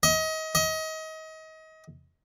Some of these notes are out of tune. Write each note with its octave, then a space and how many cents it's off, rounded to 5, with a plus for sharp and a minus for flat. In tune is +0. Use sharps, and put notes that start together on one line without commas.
D#5 +30
D#5 +30